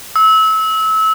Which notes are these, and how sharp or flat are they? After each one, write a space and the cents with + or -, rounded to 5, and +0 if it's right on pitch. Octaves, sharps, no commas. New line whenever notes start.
E6 -25